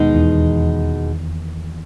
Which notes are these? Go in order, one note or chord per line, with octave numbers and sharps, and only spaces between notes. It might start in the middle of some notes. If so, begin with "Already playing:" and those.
Already playing: D#2 B2 D#3 G#3 D#4
E2 E3